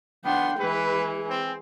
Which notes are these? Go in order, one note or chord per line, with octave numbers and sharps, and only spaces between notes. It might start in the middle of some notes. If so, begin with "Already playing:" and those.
B3 D4 F#5 G5 C6
E3 G#3 G#4 B4
C4